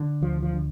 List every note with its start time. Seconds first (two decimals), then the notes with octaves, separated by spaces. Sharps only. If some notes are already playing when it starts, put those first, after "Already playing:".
Already playing: D3
0.22 D2 F3
0.42 F3
0.53 D3